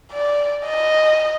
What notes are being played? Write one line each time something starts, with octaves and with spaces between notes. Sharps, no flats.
D5
D#5